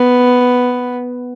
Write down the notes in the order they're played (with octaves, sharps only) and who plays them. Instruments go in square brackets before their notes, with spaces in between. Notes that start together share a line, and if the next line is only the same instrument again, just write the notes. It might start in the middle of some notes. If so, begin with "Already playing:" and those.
Already playing: [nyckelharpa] B3